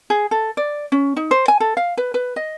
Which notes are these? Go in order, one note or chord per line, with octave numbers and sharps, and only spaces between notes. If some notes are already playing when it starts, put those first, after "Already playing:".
G#4
A4
D5
C#4
D#4
C5
G#5
A4
F5
B4
B4
D#5